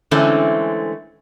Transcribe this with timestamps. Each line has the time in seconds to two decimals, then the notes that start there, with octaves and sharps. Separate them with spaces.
0.11 D3 E3 G#3 A3 C4 C#4